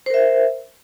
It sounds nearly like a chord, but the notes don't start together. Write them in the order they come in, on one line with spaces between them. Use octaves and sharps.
C5 A#4 E5